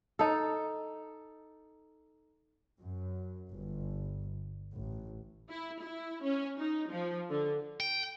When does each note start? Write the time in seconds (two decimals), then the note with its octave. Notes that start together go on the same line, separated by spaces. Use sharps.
0.19 D#4 A4
2.79 F#2
3.52 G1
4.73 A1
5.50 E4
5.82 E4
6.23 C#4
6.58 D#4
6.91 F3
7.30 D3
7.80 G5